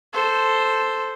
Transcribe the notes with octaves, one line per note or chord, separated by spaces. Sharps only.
A4 C5